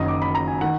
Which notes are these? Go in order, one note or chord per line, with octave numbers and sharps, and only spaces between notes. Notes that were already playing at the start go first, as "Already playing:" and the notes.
Already playing: F#1 F#2 D#3 D#5
D6
B5
A#5
G#5
D#3 F#5